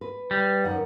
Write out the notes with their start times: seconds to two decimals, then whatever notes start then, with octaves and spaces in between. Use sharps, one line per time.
0.01 B4
0.31 G3
0.64 F#2 D#3 F#5